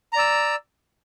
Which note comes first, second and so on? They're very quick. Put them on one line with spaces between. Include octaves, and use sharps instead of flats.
A#5 D5 E6